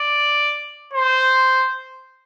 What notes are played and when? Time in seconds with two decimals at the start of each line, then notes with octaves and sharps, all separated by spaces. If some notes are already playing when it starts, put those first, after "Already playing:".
Already playing: D5
0.93 C5